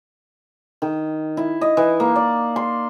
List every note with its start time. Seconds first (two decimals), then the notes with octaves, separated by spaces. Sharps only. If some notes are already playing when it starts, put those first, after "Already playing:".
0.82 D#3
1.37 E4
1.61 D#5
1.77 E3
2.00 A#3
2.16 D5
2.56 C6